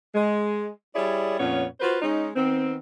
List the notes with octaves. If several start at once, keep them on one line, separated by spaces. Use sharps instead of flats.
G#3
G3 E4 G#4 C#5 D5
F2 A#2 B3 C#4 C#5
F4 F#4 B4 C5
G#3 C#4 D#4
D#3 B3 C4